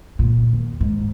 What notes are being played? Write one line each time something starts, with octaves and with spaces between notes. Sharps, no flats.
A#2
D#2
G#2